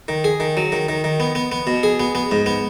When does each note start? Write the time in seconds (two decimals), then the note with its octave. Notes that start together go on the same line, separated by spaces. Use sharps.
0.08 D#3
0.24 G#4
0.40 D#3
0.57 F#3
0.72 D#3
0.89 D#3
1.04 D#3
1.20 B3
1.35 B3
1.52 B3
1.67 B2
1.83 G#4
2.00 B3
2.15 B3
2.31 G#2
2.46 B3